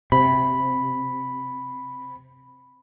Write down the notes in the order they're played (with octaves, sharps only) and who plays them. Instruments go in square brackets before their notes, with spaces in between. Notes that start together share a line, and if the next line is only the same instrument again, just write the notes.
[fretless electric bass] C3 [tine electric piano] B5